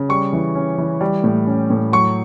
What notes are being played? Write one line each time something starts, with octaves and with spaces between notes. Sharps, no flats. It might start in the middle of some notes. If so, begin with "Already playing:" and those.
Already playing: C#3
G3 C#6
E3
C#4
E3
G3
A2
C#4
A2
F#3 C#6